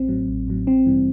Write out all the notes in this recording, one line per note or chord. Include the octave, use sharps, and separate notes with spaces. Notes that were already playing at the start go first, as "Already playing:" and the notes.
Already playing: A1 C4
A2 F#3
A1
A2 F#3
A1 C4
G2 E3 G3